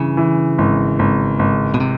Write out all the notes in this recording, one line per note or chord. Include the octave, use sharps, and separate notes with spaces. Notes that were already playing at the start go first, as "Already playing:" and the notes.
Already playing: G2 C#3 E3
E3
G#1
G#1
G#1
B2
C3